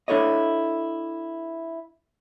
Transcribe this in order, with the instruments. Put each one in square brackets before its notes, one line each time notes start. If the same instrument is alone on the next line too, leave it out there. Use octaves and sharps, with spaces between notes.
[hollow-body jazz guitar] D4 E4 A4 C#5 D#5